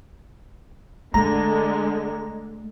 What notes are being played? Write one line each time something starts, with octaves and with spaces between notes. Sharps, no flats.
D3 G#3 A3 A#5